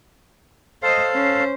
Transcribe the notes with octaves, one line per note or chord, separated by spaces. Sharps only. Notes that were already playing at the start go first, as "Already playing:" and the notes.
A4 C5 D#5 F5
C#4 C5